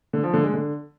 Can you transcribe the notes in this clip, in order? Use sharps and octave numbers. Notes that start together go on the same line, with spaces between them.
D3
F3
D3
G#3
D3